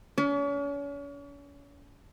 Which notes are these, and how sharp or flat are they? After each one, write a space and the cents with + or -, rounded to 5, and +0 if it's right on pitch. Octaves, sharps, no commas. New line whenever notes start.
C#4 +40